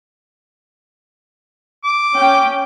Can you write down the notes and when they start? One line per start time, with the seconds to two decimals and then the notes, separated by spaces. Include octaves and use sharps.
1.84 D6
2.15 C#4 G5